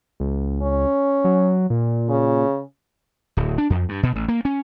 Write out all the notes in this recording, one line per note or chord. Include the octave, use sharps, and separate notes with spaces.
C#2
C#4
F#3
A#2
C#3
D1
D4
F2
G2
B2
A1
A#3
C#4